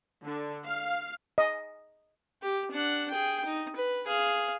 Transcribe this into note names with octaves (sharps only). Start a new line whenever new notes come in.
D3
F5
D#5
G4
D4 F#5
G#4 G5
D#4
B4
G#4 F5